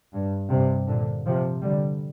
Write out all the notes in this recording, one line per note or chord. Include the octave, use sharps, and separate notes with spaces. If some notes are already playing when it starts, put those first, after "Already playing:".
G2
G2 C3
A#2 D3
C3 F3
D3 G3